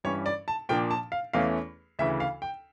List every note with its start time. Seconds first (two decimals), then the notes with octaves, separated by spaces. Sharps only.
0.04 G2 E3 G3 C#4 C#5
0.26 D5
0.48 A5
0.69 A#2 F3 A#3 D4 G5
0.91 A5
1.12 F5
1.33 E2 E3 A3 C#4 F5
1.99 D2 C#3 E3 E5
2.20 F5
2.42 G5